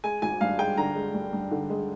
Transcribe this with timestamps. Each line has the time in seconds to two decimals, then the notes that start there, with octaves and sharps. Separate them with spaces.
0.04 G#3 G#5
0.22 G#1 G#5
0.41 G2 F5
0.58 G#3 G5
0.78 D3 A#5
0.95 G#3
1.14 G2
1.33 G2
1.51 D3
1.70 G#3